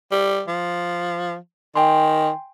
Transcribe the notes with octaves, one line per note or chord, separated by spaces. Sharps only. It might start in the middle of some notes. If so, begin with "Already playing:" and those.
G3
F3
D#3 G5 G#5 C6